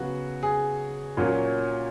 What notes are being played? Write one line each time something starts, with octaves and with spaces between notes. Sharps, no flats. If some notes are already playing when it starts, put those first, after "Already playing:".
Already playing: C#3 F#3 B3 F#4
G#4
A#2 F#3 A#3 C#4